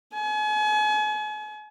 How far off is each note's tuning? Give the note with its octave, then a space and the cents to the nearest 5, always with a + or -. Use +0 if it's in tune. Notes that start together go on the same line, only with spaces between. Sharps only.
G#5 +40